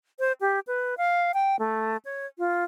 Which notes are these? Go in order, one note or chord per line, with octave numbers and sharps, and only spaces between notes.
C5
G4
B4
F5
G5
A3
C#5
F4